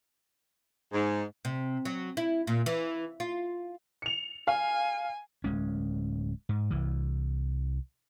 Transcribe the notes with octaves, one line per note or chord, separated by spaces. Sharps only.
G#2
C3
F#3
E4
A#2
E3
F4
C#7 F7
F5 G#5
D1 G#3 C#4
G#2
C2 E3